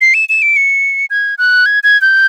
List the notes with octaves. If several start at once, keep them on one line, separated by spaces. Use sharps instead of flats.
C7
E7
E7
D7
C#7
G#6
F#6
G#6
G#6
G6